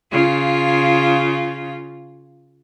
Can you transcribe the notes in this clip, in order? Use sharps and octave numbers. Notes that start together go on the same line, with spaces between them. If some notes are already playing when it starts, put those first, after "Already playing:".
C#3 F4